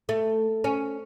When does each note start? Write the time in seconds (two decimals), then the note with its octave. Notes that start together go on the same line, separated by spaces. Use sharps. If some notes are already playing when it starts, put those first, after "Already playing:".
0.09 A3
0.64 C#4